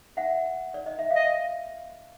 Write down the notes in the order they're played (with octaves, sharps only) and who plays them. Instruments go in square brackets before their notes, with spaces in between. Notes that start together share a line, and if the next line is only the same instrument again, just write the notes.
[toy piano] E5 F#5
D5
D#5
E5
[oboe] D#5 [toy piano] F5